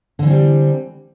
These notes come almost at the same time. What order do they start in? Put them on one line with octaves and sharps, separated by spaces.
D3 E3 C4 G3